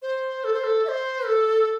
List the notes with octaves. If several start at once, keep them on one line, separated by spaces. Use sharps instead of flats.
C5
A4
C5
A4
E5
C5
A4